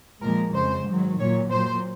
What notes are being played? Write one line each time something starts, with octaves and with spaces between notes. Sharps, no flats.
A#2 F3 G#3 A#4
F2 C#3 G#3 C5
G#2 D#3 F#3
A#2 F#3 C#5
A#2 F#3 C5